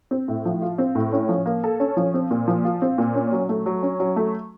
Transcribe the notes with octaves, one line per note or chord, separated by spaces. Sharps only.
C4
A2
F3
F4
C4
A2
C#4
F3
A#3
A4
C#4
F3
C4
A#2
F3
F4
C4
A#2
C#4
F#3
A3
F#3
C#4
F#3
A3